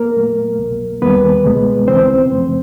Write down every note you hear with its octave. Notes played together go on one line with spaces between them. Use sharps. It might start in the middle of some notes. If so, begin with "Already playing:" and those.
Already playing: A#3 A#4
A#2 F#3 A3
C2 B2 F#3
D#2 D#3 G3 A#3 B3 B4
C#2 B2 G#3 B3
C#2 C#3 E3 C4 C5
F#2 C#3 F3 A3